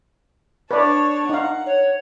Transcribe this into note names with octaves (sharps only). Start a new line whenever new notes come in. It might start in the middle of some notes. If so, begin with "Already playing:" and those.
D4 B4 C#5 D5 A5
D#4 F5 F#5
C#5